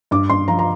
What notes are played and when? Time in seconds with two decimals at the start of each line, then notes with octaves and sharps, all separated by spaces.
0.11 G2 D6
0.30 G2 C6
0.48 F3 A#5
0.59 A#5